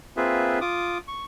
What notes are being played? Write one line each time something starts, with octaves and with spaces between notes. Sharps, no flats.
A#3 C4 F4 G#4 B4 E5
F4 D6 D#6
C#6